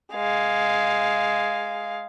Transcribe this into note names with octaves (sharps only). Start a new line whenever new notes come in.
G#3 F5